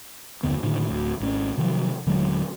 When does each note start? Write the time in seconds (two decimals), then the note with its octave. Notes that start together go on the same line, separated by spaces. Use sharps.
0.43 F#1 D#2 D3 B3
0.63 A2 D3 D#3
0.88 D1 D2
1.20 G#1 C#4
1.57 C3 D#3 F3 F#3
2.06 D#1 D3 F#3 G#3